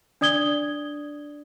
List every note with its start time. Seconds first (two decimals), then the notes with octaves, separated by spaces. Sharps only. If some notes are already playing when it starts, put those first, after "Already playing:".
0.21 D4 D5 D#6 G#6 G7